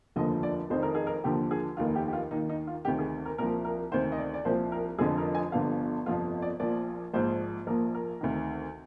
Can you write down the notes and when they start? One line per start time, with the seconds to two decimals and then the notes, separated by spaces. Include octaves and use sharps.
0.16 F1 D#2 D3 F3 D#5
0.43 D5
0.70 F1 F2 C3 D#3 C5
0.83 A#4
0.95 G#4
1.07 A#4
1.24 D#2 D3 F3 G4
1.51 G#4
1.77 F1 D#2 D#3 F4
1.95 G4
2.08 G4
2.13 F4
2.31 D#2 D#3 D#4
2.49 D#4
2.67 F4
2.85 D2 C3 D#3 G4
2.99 G#4
3.25 A#4
3.38 C2 A#2 F3 A#4
3.64 A#4
3.91 D2 C3 D#3 C5
4.12 D#5
4.18 D5
4.34 D5
4.45 C2 A#2 F3 C5
4.72 A#4
4.98 F1 F2 D3 F3 G#4
5.18 A#4
5.35 G#5
5.52 G1 G2 D3 F3 F5
6.06 G1 F2 C3 F3 F4
6.42 D5
6.60 A#1 A#2 F3 D5
7.14 A#1 G#2 F3 C5
7.67 A#1 A#2 F3 A#4
7.94 A#4
8.21 D2 C3 D#3